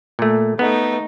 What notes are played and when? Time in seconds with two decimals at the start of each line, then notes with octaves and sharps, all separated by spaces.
0.19 A#2 A3
0.59 A3 B3 D#4